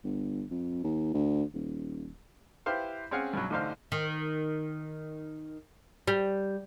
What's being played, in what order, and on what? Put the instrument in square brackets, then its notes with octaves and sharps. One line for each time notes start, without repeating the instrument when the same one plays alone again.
[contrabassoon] G1
F2
D#2
D2
D#1
[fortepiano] E4 G4 B4 C5 F5
C4 C#4 G#4 F5 F#5
G2 B2 F#3
A1 D3 D#4 C5 F5
[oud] D#3
G3